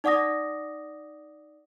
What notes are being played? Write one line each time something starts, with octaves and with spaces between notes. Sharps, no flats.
D#4 D5 F#5 D6 D#6 A#6